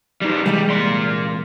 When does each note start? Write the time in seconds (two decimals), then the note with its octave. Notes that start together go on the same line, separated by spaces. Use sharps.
0.22 G3 D#4
0.46 C2 E3 G3 G#3
0.70 A#2 C6